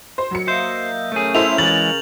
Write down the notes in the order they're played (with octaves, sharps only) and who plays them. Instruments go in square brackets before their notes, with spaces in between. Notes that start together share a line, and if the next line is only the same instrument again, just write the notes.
[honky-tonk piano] C5
F#3 C#7
[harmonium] A#3 D#5 E5 [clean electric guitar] C5 [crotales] G6
[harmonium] C#3 C#4 A#4 [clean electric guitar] A3 G#4
[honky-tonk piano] E4 A4 C5 [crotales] F7
[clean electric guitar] E3 G#3 [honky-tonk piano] A6 [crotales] F#7